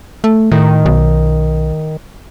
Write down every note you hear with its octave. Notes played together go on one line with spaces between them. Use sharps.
A3
A2 D#3
B1